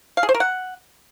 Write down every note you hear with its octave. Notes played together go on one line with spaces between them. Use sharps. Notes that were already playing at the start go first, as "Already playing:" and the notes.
F5
G#4
C5
A#4
F#5